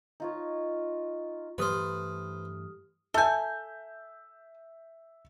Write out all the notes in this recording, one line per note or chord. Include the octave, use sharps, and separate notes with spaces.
D#4 F4 C#5
G2 E3 A3 G4 B4 C5 D#6 F6
A4 E5 G#5 G6